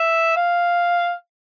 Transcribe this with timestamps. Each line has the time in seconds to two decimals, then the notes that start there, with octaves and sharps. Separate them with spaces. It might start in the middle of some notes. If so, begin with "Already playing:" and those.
Already playing: E5
0.36 F5